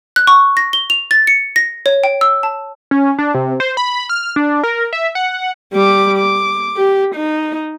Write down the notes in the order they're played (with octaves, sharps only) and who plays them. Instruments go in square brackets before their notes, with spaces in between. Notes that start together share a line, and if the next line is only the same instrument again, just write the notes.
[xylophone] F#6
C#6
A#6
G7
F7
A6
C#7
A#6
C#5
G5
E6
A5
[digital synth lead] C#4
D4
C3
C5
B5
F6
D4
A#4
E5
F#5
[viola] G3 D6
D6
G4
D#4